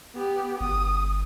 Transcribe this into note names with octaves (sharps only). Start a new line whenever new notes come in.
B3 G4
G1 D#6